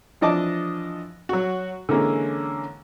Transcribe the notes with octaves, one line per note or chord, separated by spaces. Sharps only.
E3 F3 D4 D#5 A5 D6
F#3 F#4
D3 E3 G#3 A#3 C#4